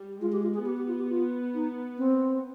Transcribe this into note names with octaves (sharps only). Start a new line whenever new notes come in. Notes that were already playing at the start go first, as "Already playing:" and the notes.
Already playing: G3
G#3 F4
G4
F4
G#4
B3 G4
G4
F4
G4
F4
D#4
C4